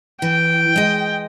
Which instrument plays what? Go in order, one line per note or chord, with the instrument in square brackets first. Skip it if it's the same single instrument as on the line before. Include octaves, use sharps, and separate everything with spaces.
[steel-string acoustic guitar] E3 [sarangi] G5
[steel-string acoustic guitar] G#3 D#5